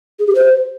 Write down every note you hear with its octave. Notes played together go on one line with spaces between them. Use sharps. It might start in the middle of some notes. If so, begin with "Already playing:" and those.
G#4
G4
C5